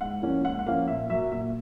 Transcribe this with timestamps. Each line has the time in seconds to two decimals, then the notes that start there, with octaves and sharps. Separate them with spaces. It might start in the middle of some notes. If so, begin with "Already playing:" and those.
0.01 G#2 F#5
0.22 F3 A#3 C#4
0.44 G#2 F#5
0.59 F#5
0.66 F3 A#3 C#4 F5
0.87 A#2 E5
1.10 F#3 A#3 E5
1.31 A#2 E5